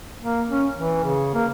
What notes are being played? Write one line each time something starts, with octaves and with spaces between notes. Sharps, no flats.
A#3
C#4
E3
C#3
A#3